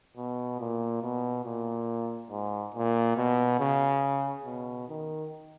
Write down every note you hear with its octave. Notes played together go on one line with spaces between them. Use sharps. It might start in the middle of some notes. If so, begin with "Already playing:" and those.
B2
A#2
B2
A#2
G#2
A#2
B2
C#3
B2
D#3